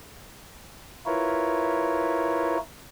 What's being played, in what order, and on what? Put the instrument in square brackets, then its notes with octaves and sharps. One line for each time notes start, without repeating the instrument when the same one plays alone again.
[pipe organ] E4 F4 A#4 B4 C#5